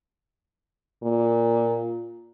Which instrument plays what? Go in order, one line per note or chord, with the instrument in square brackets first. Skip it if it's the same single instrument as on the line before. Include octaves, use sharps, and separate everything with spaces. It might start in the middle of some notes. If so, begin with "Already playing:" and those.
[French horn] A#2